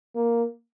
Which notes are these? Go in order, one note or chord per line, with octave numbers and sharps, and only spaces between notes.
A#3